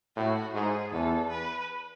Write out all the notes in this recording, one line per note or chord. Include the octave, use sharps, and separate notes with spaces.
A2 F#4
G#2 G#4
E2 A4
B4